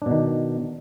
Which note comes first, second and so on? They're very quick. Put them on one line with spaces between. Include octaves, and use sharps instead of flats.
D4 B2 D#3